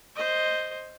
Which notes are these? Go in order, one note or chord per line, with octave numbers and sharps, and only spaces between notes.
C5 D#5